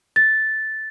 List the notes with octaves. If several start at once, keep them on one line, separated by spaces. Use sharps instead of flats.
A6